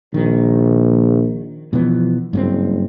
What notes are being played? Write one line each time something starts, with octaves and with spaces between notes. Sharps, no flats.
A#1 D#3
B2 E3 F3 B3
F#1 G2 A#3 C4